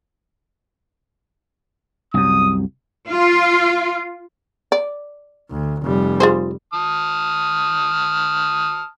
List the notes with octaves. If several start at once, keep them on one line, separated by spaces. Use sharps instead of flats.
C2 F#2 D#6
F4
D5
D2
F1 G3
F4 G#4 C5
A5 D#6 F6